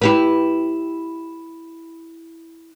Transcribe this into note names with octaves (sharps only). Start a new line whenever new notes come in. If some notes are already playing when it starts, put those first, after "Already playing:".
E4 G4 B4